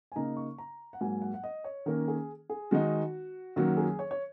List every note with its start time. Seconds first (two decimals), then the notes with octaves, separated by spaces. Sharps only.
0.12 G#5
0.16 C#3 A#3 D#4 A#5
0.37 C#6
0.58 A#5
0.93 F#5
1.01 G#2 F#3 A#3 G#5
1.22 F#5
1.34 F#5
1.44 D#5
1.64 C#5
1.86 D#3 A#3 C#4 A#4
2.08 G#4
2.49 G#4
2.71 D#3 G#3 D#4 F#4
3.56 F#2 D#3 F#3 A#3 F#4
3.77 G#4
3.99 C#5
4.11 C#5